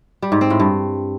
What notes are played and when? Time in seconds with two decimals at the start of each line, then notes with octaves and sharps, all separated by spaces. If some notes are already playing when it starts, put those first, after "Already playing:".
0.22 G3
0.32 G#2
0.41 C4
0.50 A2
0.60 G2